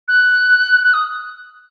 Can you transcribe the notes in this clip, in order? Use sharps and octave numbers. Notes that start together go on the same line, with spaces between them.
F#6
F#6
D#6